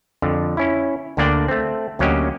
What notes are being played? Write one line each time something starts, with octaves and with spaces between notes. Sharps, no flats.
F2 D3
C#4 E4
D2 D3 A#3 D4 D5 G5
A3 C4
D2 F#3 A#3 C#4 G4 D#5